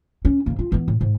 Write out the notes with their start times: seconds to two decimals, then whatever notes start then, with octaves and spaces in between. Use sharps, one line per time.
0.25 C#4
0.46 G#2 A#3
0.59 F4
0.72 E3 B3
0.88 A2
1.01 G#2